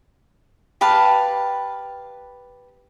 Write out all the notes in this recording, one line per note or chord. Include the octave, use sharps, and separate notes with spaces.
G4 B4 F5 A5